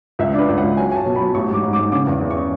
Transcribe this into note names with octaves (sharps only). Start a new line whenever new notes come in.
C#2 E5
D4 B4
C#2
F#5
C#2
F#3 G#5
F#3 G#5 A5
B2
B5
F#3
A1 C#6
G#2 D6
G#2
D6
G#2
C#3 D6
E2
E2
C#6